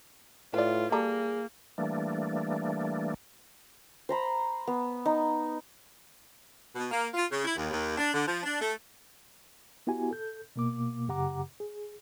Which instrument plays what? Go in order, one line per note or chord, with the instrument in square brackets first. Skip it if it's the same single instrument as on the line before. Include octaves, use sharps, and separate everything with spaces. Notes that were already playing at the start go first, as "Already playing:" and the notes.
[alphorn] A2 [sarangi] F4 [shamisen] B4 D5
[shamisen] G3 A4 A#5 [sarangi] A#3 [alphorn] G#4
[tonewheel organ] E3 G3 A3 A#3 D4
[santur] C5 A#5 B5
B3
D#4
[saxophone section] B2
A#3
F4
C#3
E4
D#2
D#2
D4
D3
F3
D4
A3
[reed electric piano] B3 E4 F#4 G4 G#5
A4 G6
B2 A#3 D6
F#2 C#3 G4 F#5 A#5 D6
G#4